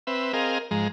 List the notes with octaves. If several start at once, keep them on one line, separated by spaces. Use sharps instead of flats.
C4 B4 E5
C4 G#4 A#4 D#5 F5
G#2 F3 G#3 A#5